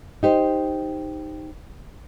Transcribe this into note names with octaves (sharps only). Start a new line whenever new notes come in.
D#4 G4 C5